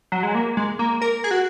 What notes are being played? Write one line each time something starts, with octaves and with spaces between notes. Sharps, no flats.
F#3
G#3
A#3
G#3
A#3
A#4
G#4
F#4